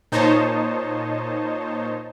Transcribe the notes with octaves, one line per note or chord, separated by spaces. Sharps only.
A#2 D#4 C5 C#5 D#5 A5